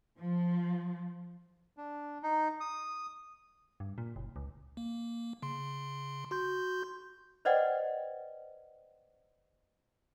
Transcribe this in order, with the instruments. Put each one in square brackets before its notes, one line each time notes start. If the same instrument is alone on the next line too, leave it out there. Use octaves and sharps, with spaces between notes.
[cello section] F3
[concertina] D4
D#4
D#6
[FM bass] G2
A#2
F#1
C#2
[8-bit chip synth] A#3
C#3 C6
F#4 C6 G6
[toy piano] B4 C5 D5 D#5 F#5 G5